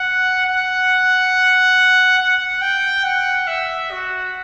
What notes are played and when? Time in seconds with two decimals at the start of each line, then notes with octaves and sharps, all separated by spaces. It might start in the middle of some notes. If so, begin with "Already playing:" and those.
Already playing: F#5
0.45 F#5
2.18 F#5
2.62 G5
3.04 F#5
3.47 E5
3.91 F#4